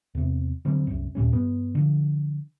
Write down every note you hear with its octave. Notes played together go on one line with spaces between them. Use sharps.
E2 C3
D3 F#3 G3 C4
C2 F#2
D#2 A#2 G3 C#4
G2 B3
D3 F3